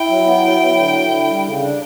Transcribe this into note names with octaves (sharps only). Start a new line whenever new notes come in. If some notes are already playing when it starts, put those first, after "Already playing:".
Already playing: E4 G5
F#3
B3
E4
F#3
D3
E4
D3
G3
C#3
D4